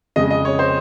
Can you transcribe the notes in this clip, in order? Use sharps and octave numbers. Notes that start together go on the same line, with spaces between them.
F2 C#3 G#3 D#5
D#5
C#5
C5